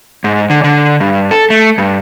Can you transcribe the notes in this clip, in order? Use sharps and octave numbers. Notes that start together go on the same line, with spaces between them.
G#2
D3
D3
G2
A4
A3
G2